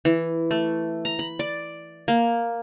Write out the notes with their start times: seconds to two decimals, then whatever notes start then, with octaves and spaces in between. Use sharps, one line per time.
0.05 E3
0.51 A3
1.05 A#5
1.19 B5
1.39 D5
2.08 A#3